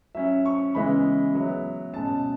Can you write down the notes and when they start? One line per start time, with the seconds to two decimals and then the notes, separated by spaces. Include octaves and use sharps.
0.15 F#3 C#4 E4 E5
0.46 C#6
0.75 C#3 E3 G#3 B3 E4 B5
1.35 F#3 B3 E4
1.93 B2 G#3 C#4 A5